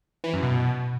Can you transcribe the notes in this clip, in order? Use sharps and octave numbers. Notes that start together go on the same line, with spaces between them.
E3
F#2
B2